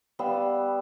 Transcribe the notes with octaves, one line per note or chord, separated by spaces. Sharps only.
G3 B3 F5 E6